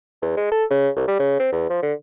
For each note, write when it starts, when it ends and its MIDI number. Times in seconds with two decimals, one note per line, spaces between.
0.22 0.36 40
0.37 0.50 56
0.52 0.64 69
0.70 0.88 49
0.96 1.03 36
1.08 1.17 55
1.19 1.38 49
1.39 1.51 60
1.52 1.69 40
1.70 1.81 53
1.82 1.93 50